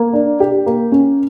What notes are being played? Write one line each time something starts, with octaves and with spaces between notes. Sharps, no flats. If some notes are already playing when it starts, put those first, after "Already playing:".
Already playing: A#3
D4
G4
A#3
C#4